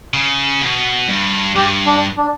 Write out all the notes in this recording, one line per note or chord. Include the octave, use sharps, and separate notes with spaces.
C#3
B2
G2
G2 G4
D4
D4